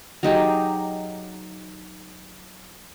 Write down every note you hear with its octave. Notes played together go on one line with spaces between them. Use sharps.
F#3 D#4 G4 G#4